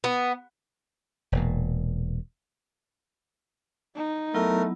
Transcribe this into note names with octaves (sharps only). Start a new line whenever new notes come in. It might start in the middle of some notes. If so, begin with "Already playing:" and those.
B3
E1 A#2
D#4
F#3 A3 B3 E4 A#4